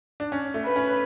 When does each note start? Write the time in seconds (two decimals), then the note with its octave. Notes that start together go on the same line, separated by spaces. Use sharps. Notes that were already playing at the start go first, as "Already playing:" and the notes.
0.20 D4
0.32 C#4
0.54 A3
0.65 B4
0.76 C#4